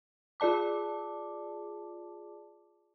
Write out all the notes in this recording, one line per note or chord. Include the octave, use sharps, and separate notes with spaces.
F4 G#4 D5 A5 D6